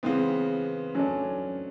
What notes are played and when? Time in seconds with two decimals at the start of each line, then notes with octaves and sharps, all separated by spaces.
0.03 C#3 E3 G#3 B3 C4
0.94 F#3 A3 C#4 D4